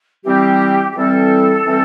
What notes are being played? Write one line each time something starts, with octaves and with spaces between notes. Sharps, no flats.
E3 G3 C4 G4
G4
E3 G3 C4 A4
E3 G3 C4